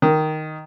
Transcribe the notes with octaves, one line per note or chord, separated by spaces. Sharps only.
D#3